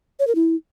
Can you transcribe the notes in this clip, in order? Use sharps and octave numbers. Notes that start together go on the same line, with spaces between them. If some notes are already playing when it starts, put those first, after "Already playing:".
C#5
A#4
E4